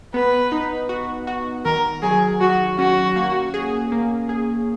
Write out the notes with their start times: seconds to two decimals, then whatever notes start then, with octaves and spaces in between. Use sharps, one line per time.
0.14 B3 B4
0.52 D#4
0.89 F#4
1.27 F#4
1.65 D#3 A#4
2.02 F#3 G#4
2.41 F#3 F#4
2.78 C#4 F#4
3.16 A#3
3.54 G#4
3.92 A#3
4.29 G#4